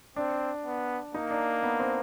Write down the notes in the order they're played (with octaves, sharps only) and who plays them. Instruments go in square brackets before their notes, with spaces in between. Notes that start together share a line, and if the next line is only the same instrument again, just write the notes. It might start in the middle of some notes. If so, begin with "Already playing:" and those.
[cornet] C4 [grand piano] D4
[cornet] B3
[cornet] A#3 [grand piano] D#4
[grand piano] D4
B3
C4